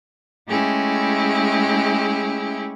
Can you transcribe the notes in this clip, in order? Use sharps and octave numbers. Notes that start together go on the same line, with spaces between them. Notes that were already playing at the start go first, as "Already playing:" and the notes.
G#3 A3 C#4 E4 G4 G#4